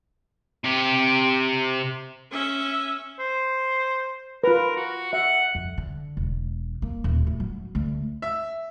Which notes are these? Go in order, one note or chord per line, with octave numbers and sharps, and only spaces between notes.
C3 G4
C#4 E5
C5
F4 A#4 B4
F#4
E5 F#5
F2
D3
E1
A#3
D#1
A2
F#3
D2
E5